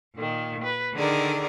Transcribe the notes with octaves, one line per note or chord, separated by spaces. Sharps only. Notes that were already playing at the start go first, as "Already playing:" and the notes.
A#2 D#3
B4
D3 D#3 G#4 A#4 D5